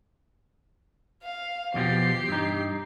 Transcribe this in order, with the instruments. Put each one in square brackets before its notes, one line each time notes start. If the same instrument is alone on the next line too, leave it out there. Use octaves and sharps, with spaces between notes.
[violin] F5
[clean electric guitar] E2 B2 F3 [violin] G4 C7
[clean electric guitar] G2 D#4